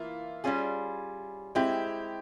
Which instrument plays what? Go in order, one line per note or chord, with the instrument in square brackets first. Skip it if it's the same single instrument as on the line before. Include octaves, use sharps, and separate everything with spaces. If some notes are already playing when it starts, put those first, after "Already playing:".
Already playing: [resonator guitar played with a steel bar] E3 A#3 [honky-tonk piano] E4 F4
[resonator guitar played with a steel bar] G3 C#4 F4 G#4
[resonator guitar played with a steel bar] G#3 C4 E4 [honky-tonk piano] G4